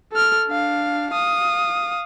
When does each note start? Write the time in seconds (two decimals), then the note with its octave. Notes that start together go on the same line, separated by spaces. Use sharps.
0.12 A4 F6
0.47 D4 F5
1.12 F5 D#6